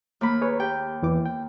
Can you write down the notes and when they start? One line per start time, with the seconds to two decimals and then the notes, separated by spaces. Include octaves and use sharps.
0.21 D#2 A#3 B5
0.41 G#4 B4 C#5
0.60 G4 G5
1.03 E2 E3 D6
1.26 G5